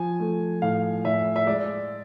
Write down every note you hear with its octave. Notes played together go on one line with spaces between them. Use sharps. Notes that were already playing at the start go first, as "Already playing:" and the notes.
Already playing: F3 G#5
A3
A2 F5
A2 E5
E5
G#3 D5